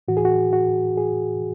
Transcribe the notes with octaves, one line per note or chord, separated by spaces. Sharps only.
A2 E3 F#4
G#4
F#4
F#4
G#4